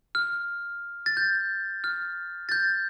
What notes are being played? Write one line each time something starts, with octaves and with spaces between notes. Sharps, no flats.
F6
A6
G6
F6
A6
G6